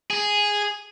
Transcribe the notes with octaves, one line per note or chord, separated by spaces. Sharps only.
G#4